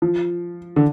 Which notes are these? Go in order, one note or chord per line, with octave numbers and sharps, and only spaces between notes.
F3
D3